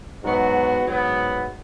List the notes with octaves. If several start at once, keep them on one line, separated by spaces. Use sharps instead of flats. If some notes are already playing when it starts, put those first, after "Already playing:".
G#2 F#3 B3 F#4
G#2 F#3 B3